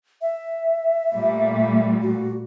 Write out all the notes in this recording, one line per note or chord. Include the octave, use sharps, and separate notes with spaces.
E5
A#2 G3 A3
F#4